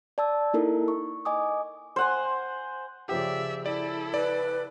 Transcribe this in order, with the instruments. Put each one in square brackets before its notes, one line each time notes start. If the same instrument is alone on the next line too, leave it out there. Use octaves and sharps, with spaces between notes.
[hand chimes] D5 A5 E6
A#3 D#4 E4 A4 A#4
C#6
D#5 G#5 D6 D#6
[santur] C5 F#5 G#5
[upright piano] C#3 F3 G4 [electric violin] D5 E5
[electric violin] E4 A4 [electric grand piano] D5
[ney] B4 [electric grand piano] D5